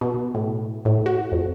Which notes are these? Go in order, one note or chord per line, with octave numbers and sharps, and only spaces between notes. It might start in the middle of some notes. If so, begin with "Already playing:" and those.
B2
A2
A2
F#4
F2